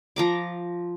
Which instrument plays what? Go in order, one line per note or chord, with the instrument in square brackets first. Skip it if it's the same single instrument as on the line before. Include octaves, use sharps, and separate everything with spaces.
[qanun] F3 A#5 D6